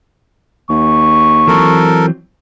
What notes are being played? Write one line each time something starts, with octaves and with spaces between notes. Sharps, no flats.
D#2 C#6
E3 F#3 C4 A4 A#4